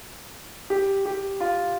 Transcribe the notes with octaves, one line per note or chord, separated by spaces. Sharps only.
G4
G4
F4